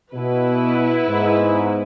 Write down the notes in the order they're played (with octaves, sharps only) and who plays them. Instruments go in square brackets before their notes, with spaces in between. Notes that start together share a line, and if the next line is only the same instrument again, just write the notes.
[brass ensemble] B2 [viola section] B3 E4 B4
[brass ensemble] G#2